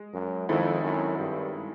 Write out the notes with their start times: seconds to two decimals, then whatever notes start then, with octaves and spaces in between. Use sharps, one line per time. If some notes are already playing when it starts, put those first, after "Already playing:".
Already playing: G#3
0.14 F#2
0.49 F2 D#3 G#3 C4 E4 A4
0.83 F#2
1.18 G2